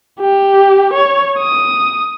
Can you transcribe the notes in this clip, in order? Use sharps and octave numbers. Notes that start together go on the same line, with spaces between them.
G4
C#5
D#6